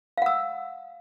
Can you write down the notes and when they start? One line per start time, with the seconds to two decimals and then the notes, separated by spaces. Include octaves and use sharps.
0.18 F5
0.22 F#5
0.26 E6